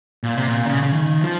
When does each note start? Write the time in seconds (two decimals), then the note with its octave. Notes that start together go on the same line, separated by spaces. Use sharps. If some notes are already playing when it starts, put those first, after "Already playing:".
0.23 A#2
0.35 C3
0.48 A#2
0.66 C#3
0.83 C#3
0.93 D#3
1.21 F3